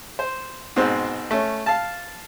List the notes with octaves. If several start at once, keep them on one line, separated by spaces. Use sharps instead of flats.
C5
G#2 B2 C4
A3 C#4
F5 A5